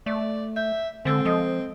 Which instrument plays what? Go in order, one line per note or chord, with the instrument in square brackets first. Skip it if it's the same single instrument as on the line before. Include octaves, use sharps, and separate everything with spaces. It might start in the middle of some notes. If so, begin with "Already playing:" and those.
[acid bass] A3 [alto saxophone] D5
[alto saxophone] E5 [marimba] G6
[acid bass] D3 [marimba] G#3 A4 E6 [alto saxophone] C4
[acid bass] F3 [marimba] A4 D#5 D#6